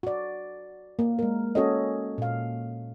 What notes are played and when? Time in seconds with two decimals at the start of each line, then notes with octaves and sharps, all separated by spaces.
0.03 F#4 D5
0.99 A#3
1.19 G#3 A#4
1.55 C#4 F#4 A4 C#5 D#5
2.18 A#2 F5